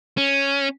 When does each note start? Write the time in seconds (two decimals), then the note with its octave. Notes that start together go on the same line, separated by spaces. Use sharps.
0.17 C#4